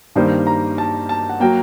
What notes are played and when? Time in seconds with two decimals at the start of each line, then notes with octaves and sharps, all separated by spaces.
0.16 G2 D#3 G3 A#3 C5
0.47 A#5
0.78 A5
1.09 A5
1.30 F#5
1.40 F#3 A#3 G5